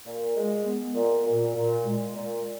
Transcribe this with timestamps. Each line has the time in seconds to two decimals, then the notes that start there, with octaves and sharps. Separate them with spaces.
0.07 A#2
0.36 G#3
0.66 B3
0.96 A#2
1.26 A#2
1.56 A#2
1.86 G#3
2.16 A#2